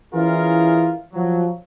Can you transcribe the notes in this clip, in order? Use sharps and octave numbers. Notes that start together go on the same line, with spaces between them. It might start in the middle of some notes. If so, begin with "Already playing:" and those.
E3 C#4 E4 F4 G#4 A#4
F3 F#3